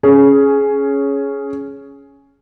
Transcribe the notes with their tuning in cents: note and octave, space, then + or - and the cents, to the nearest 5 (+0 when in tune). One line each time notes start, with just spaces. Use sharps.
C#4 +0 G#4 +15